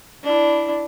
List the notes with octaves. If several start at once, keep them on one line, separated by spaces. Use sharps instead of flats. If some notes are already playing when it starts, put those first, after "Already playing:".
D4 E4